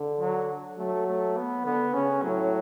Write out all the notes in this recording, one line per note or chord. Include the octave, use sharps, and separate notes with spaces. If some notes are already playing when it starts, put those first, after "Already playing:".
Already playing: D3
F#3
F#3 A3
A3
B3
D3 B3
C#3 C#4
A2 F#3